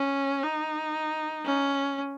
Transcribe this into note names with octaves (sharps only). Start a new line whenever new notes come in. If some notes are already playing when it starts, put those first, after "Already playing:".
Already playing: C#4
D#4
C#4